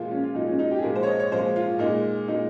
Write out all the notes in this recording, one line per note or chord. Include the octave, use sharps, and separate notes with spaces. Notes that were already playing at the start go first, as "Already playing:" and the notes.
Already playing: A#2 F3 G#3 F4
C#4
F4
A#2 F3 G#3 D#4
C#4
D#4
G4
G#4
A#2 F3 G#3 A#4
C5
C#5
D#5
C#5
A#2 F3 G#3 C5
F4
A#2 G#3 D#4
A#2 G#3 D#4